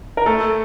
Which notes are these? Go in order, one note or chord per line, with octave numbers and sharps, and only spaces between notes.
A#4
A3 A4